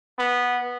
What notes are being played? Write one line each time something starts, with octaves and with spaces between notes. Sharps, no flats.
B3